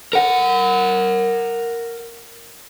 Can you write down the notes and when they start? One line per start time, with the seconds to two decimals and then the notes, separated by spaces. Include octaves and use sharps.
0.13 A#4 F#5